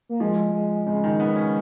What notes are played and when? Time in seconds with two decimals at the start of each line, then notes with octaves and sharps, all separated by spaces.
0.09 A#3
0.20 F3 G#3
0.54 G#3
0.86 C#3 G#3
1.04 D#3
1.20 B3
1.36 C#4